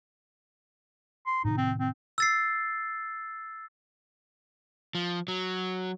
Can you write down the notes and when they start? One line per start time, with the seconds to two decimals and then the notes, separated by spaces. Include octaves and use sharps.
1.26 C6
1.45 A2 C3 D#3 D#4
1.57 C4
1.80 C4
2.18 E6 A6 C7
4.95 F3
5.28 F#3